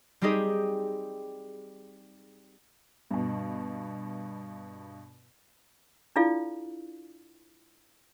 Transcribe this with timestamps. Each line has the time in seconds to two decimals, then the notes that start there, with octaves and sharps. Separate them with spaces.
0.21 G3 C4 D#4 G4 G#4 D#5
3.11 G2 B2
6.16 D4 E4 F4 A4 D5 F5